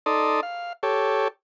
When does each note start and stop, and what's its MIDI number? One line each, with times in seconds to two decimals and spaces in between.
0.06 0.41 63
0.06 0.41 69
0.06 0.41 74
0.06 0.41 84
0.06 0.41 87
0.43 0.73 77
0.83 1.28 67
0.83 1.28 69
0.83 1.28 73